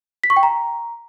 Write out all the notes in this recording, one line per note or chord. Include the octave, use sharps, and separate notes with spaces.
B6
C#6
G5
A#5